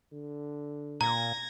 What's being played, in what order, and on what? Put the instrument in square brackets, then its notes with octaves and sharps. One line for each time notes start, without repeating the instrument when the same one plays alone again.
[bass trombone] D3
[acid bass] A#2 [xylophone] A#5 [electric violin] G#6 A#6